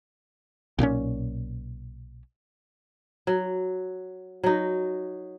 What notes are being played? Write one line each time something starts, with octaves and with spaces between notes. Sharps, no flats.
B1 A#2 F3 C#4
F#3
F#3 D#4